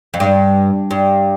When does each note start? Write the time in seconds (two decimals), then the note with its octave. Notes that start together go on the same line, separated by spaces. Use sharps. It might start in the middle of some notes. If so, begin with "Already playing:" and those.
0.14 F2
0.20 G2
0.91 G2